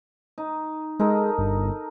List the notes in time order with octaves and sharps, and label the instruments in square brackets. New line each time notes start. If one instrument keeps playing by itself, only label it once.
[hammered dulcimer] D#4
[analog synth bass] G#3 [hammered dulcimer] D#4 A4 A#4
[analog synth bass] G1